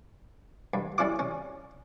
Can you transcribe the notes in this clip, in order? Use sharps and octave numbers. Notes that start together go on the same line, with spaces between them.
G2
G3 C#4 E4 D6
C#4